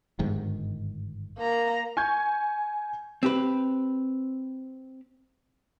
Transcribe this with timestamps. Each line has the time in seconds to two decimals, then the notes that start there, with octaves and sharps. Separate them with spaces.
0.19 G1 G#2 D#3
1.38 A#3 A#5
1.97 G#5 C#6 G6 G#6
3.23 C4 G4 B4